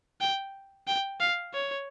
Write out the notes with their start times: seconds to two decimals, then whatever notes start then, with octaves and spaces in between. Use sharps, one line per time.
0.21 G5
0.87 G5
1.20 F5
1.54 C#5